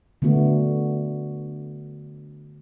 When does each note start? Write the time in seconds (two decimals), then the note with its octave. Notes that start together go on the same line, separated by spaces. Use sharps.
0.22 D3 A3 B3 F#4